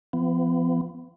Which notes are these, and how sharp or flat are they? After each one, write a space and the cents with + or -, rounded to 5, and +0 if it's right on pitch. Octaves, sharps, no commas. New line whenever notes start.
F3 -30 B3 +35